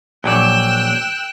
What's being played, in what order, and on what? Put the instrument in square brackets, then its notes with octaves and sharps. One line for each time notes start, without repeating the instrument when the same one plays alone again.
[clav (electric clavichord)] A#1 F#3 D5 [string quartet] G5 E6 F#6